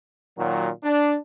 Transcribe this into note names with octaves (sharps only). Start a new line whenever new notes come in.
A#2 D#3 F#3
D4